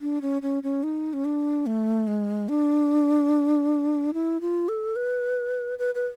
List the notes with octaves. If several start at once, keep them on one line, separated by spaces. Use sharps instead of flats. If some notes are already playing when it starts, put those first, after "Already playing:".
D4
C#4
C#4
C#4
D#4
C#4
D4
A3
G#3
D4
E4
F4
A4
B4
B4
B4